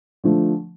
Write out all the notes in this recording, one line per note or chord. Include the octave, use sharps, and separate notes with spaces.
D3 F3 A3